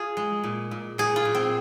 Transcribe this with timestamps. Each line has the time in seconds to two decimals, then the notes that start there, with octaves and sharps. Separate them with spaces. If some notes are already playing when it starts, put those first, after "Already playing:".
Already playing: F4 G#4
0.17 G#3
0.44 A#2
0.71 A#2
0.98 A#2 G#4
1.16 F4
1.25 A#2
1.35 C4